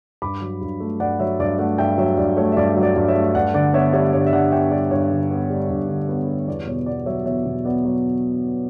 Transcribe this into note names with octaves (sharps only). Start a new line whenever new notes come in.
G2 B5 D6
F#3
G2
A3
G2 D5 F#5
F#3 C#5 E5
G2 D5
A3 D5 F#5
G2 E5 G5
F#3 C#5 E5
G2 D5
A3 C#5
E5
G2 D5
F#3
D5
G2
C#5 E5
A3
G2 D5 F#5
D3 D5 F#5
B3 C#5 E5
G3 C#5 E5
G2 C#5 E5
E5
D3 D5 F#5
B3 E5 G5
G3 D5
G2 C#5
D3
B3
G3
G2
D3
B3
G3
E2 D5
B2 C#5
B3 D5
F#3 C#5 E5
E2 C#5 E5
B2
B3 D5
F#3